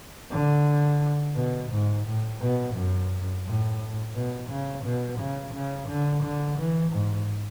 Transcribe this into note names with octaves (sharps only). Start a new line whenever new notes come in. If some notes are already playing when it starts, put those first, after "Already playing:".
D3
B2
G#2
A2
B2
F#2
A2
B2
C#3
B2
C#3
C#3
D3
D3
E3
G#2